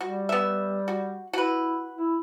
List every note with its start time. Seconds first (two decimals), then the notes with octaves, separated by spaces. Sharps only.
0.01 G3 F#4
0.29 B3 E5
0.88 F#4
1.33 E4 F#4 B4
1.96 E4